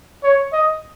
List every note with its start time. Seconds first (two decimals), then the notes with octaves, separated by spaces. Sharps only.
0.23 C#5
0.53 D#5